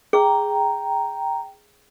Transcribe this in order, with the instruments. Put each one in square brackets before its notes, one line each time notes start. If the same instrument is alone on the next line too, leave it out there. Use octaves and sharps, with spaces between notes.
[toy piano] G#4 [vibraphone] G5 A#5